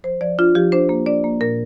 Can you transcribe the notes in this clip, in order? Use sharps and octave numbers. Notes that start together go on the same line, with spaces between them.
F3 C5
F3 D5
D4 F4
F3 G4
D4 C5
A#3
D4 D5
A#3
A#2 A#4